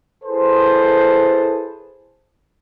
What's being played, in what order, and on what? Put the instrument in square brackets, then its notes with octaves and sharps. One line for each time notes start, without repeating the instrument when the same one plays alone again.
[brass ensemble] E4 G#4 A4 B4 C5